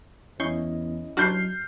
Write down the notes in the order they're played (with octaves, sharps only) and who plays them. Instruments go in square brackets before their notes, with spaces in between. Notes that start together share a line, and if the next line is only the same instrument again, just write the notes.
[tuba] E2 [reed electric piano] C#4 E4 D#5 [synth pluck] C#6 G6 C7
[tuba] F#3 [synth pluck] D4 F#4 [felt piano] F6 G6 C7